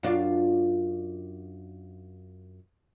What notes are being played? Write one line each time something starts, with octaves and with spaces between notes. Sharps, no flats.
F#2 D4 F4